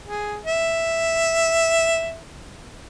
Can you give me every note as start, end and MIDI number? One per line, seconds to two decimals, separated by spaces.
0.06 0.38 68
0.46 2.20 76